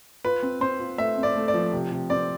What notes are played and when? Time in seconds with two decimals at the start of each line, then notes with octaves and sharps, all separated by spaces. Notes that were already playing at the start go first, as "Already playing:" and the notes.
0.25 F4 B4
0.43 C4
0.61 C4 C5
0.80 F4
0.98 A3 E5
1.17 C4
1.23 D5
1.36 A3
1.48 D5
1.54 F3
1.73 C3
1.91 C3
2.10 C4 D5